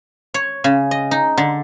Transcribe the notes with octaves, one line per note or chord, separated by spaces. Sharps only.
C#5
C#3
D#5
D#4
D3